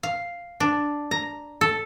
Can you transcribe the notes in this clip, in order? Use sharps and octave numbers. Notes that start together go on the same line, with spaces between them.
F5
D4
A#5
A4